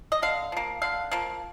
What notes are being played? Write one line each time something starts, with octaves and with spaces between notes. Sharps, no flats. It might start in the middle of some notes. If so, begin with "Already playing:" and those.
D#5
D3 F5
F3 A#3
D3 F5
F3 A#3